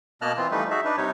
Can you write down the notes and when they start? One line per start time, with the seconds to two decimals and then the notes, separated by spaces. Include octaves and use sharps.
0.22 B2 A#3 D#5 A5 F6 F#6
0.37 E3 C4 F4
0.51 E3 F3 G3 A3 D#4 B4
0.70 D#4 F#4 G#4 E5
0.85 D4 D#4 B4
0.97 C3 G3 D#4 C#5